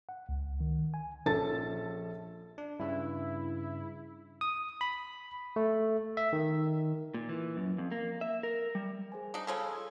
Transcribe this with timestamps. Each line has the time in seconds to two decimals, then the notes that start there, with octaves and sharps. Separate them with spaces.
0.09 F#5
0.29 C#2
0.61 D#3
0.94 G#5
1.26 A#1 F3 C#4 A4 A5 A6
2.58 D4
2.80 G2 C#3 E4
4.41 D#6
4.81 B5
5.56 A3
6.17 E5
6.33 D#3
7.14 A#2
7.29 E3
7.57 F#2
7.78 F2
7.92 A#3
8.21 E5
8.43 A#4
8.75 G3
9.12 G#4 C5 G#5
9.34 D4 D#4
9.47 C#3 F3 C#4 A4 D#6 E6